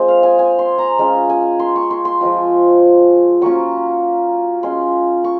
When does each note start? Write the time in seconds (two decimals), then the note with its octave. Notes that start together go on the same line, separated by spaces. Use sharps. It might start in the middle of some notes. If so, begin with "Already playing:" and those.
Already playing: G#3 C4 F4
0.08 F5
0.23 G#5
0.39 G#5
0.59 C6
0.78 A#5
0.99 G#3 C#4 F4
1.30 G#5
1.59 C6
1.76 C#6
1.91 C6
2.05 C6
2.21 F3 G#3 C4 F4
3.41 F#3 A#3 C#4 F4 C#6
4.63 G#3 C#4 F4 C6
5.24 C#6